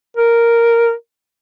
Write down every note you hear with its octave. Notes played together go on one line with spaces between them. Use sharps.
A#4